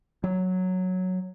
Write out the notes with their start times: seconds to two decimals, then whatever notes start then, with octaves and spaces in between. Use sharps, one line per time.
0.24 F#3